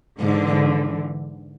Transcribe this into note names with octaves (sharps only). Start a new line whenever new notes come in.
G#2 D3 E3